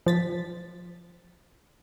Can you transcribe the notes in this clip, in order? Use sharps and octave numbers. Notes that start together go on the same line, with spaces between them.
F3 A6 B6